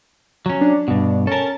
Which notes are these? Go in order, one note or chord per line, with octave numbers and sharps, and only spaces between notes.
F#3 C#4
D4
G2 B2
C#4 A4 A#4 A5